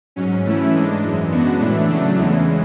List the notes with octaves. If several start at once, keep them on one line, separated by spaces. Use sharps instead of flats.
G#2 F#3 C#4
E3 A3 C#4 E4
G#2 G#3 D4
F#2 E3 G#3
C#3 G#3 B3 D4 F#4
A2 E3 A3 D4
C#3 F#3 A3 D4
E2 C#3 E3 G#3